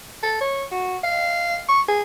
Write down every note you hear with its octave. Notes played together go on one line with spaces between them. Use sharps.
A4
C#5
F#4
F5
C#6
G#4